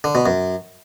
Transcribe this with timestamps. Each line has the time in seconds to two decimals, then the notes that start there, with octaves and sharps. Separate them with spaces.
0.04 D3
0.15 B2
0.26 F#2